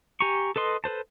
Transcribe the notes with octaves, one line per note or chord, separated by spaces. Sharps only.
G4 G#5 A#5 C#6
A4 B4 D#5 C6
A4 B4 C5 A5